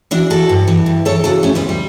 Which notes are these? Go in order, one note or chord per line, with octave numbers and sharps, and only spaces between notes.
E3 D4 F#4
E3 F#4 A4
G2
E3
G2
E3 A4 C#5
C#3 F#4 A4
D2 A3 C#4
G3 B3
D2
G3